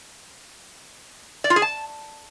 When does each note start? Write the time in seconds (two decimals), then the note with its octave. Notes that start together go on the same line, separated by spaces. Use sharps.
1.44 D5
1.50 F4
1.56 G#4
1.62 A5